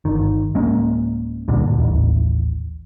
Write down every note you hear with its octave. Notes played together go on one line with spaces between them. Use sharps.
G1 D#3
D1 G#3 A#3 C#4
D2 G2 A#2 D3
A1 D#2